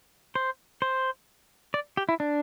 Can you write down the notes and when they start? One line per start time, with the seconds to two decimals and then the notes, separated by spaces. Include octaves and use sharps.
0.35 C5
0.82 C5
1.74 D5
1.97 G4
2.09 E4
2.20 D4